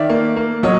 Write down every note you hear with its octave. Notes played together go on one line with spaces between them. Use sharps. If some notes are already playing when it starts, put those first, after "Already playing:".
Already playing: D#3 D5 E5
A#3
A#3
F#3 C#5 D#5